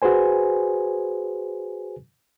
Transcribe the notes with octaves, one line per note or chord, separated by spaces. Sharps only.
F#4 G#4 B4 C5 G#5